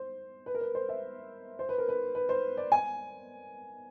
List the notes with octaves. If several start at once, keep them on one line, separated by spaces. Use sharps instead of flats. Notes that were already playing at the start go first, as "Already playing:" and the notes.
Already playing: C5
B4
A#4
B4
C5
E5
C5
B4
A#4
B4
B4
C5
D5
G#5